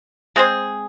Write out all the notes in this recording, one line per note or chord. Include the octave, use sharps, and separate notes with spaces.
G#3 C4 G#4 C5